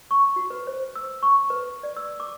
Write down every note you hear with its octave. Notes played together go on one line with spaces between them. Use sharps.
C#6
F#4
B4
C5
E6
C#6
B4
D5
E6
D6